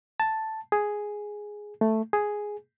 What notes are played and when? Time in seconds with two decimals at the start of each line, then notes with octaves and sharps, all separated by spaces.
0.20 A5
0.72 G#4
1.81 A3
2.13 G#4